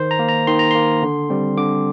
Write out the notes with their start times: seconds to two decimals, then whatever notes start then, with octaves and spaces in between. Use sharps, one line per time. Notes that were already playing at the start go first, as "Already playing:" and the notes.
Already playing: D#3 C5
0.11 A#5
0.19 A#3
0.29 A#5
0.47 D#3 C6
0.59 A#5
0.71 A#3 C6
1.03 D3
1.30 G3 C4
1.58 D3 D6